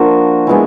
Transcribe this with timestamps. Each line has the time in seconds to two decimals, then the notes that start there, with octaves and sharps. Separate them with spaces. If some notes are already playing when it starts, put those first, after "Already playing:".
Already playing: F3 A#3 D4 F#4
0.47 E3 G#3 B3